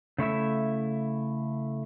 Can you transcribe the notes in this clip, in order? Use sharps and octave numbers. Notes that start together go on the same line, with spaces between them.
C#3 A3 E4 E5